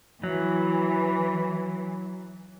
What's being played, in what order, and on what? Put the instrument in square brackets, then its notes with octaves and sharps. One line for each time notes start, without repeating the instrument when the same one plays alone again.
[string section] E3 [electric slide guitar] F#3